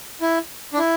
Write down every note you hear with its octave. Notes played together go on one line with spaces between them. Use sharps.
E4
D4
E4